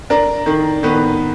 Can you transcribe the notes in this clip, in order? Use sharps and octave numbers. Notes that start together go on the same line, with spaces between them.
D4 A#4
D#3
D#3 B3 B4